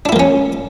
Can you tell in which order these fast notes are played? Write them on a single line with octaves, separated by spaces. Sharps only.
D4 E4 A#3 F3 C#4